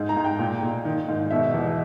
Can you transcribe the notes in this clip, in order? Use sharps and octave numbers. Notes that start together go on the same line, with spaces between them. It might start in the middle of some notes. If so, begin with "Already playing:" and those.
Already playing: G#2
A#5
G#2
G5
A#2
A#2
D#3
G#2
B2 E5
E2